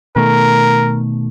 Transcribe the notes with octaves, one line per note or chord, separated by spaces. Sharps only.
B2 D#3 A3 A#4